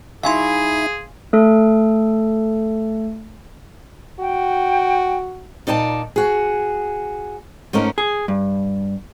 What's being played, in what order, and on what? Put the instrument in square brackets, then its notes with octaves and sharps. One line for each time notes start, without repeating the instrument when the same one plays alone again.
[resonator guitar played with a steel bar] F#3 E4 [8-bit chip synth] D#4 E5 [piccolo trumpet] G#4 [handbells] F5 G#5 C6
[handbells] A3 A4
[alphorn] F#4 [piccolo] G5
[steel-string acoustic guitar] A#2 D#4 D5 G#5 A5
F#4 G#4
G#2 A3 C#4 D#4 A#4
[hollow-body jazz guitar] G#4
G2